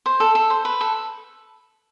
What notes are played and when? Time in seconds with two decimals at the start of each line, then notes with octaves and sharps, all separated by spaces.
0.06 C5
0.20 A4
0.35 A4
0.50 C5
0.65 B4
0.81 A4